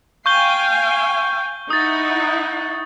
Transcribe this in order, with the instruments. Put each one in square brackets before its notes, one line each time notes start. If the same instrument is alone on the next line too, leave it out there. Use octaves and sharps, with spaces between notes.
[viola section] F5 G5 G#5 [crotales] C#6 G6 G7
[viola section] D#4 E4 F#5 [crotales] D#6 A6